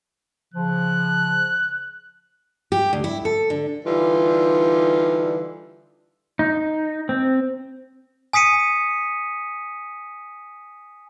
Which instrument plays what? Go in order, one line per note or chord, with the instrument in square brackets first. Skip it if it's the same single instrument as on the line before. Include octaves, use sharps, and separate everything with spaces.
[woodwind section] C#3 F3 [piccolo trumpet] F#6
[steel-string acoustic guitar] G4
D2
E4
A4
D3
[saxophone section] D3 E3 G3 D#4 F4
[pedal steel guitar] D#4
C4
[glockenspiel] G#5 D#6 B6 C#7 D#7